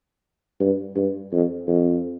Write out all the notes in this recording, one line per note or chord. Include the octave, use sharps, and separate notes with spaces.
G2
G2
F2
F2